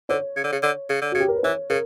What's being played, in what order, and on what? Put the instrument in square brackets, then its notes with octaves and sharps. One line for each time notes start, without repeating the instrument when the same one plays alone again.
[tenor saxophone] D3 [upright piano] C#5
[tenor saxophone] C#3
D3
C#3
D3
C#3
D3
[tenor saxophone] C#3 [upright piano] F#4
[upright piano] G4
A#4
B4
[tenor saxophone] E3 [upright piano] C#5
[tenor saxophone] C#3 [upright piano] A#4